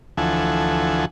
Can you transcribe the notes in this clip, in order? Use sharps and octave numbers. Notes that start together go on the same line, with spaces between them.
D2 E3 F3 A4 F#5 G#5